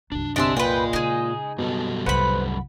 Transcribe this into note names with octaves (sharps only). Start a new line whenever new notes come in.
C2 F#2 D4
G1 C3 D4 D#5 E5 G#5 C6 E6
A#2 F4 B4 G5
C#3 D#4 G#4
F#2 B2 G3 A4
C2 A2 B4 C5 F#5 B5